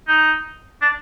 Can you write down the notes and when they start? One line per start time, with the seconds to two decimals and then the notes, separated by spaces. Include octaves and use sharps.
0.08 D#4
0.81 D4